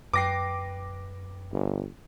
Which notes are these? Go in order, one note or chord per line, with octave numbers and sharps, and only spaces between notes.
F#2 B4 G5 D6 A#6 C7
G1